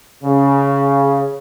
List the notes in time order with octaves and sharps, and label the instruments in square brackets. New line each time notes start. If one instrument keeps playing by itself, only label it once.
[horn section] C#3